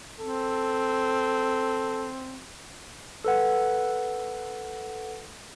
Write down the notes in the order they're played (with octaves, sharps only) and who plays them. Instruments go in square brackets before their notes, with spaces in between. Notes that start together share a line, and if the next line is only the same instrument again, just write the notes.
[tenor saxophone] C4 [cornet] A4
[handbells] A4 B4 F#5